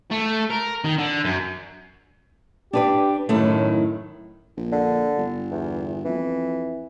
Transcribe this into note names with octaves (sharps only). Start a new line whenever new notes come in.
A3
A#4
D#3
D3
F#2
D4 G4 B4 D5
F#2 A2 D#3 A3
A#1
D3
G1
E2
F2 E3